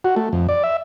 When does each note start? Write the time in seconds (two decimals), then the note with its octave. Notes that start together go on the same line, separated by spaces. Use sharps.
0.04 F#4
0.16 A3
0.33 F2
0.49 D5
0.64 E5